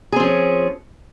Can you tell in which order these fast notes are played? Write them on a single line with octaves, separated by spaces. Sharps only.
G#4 C4 F3 C#4